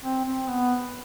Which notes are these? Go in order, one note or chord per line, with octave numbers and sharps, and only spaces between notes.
C4
C4
B3